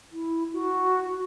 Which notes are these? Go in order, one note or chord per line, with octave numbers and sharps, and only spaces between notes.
E4
F#4